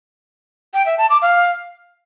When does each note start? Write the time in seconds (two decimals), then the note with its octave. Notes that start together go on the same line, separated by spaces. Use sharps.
0.74 G5
0.86 E5
0.98 A5
1.10 D6
1.22 F5